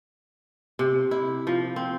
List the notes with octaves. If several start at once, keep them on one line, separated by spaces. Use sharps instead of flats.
C3
E4
F3
C4